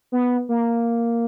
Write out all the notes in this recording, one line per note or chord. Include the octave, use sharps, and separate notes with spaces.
B3
A#3